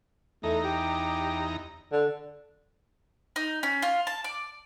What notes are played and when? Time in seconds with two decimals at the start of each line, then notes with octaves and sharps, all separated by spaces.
0.43 E2 A3 D#4 A#5
0.64 G4
1.92 D3
3.36 D#4
3.63 C#4
3.82 F4
4.07 A5
4.24 D5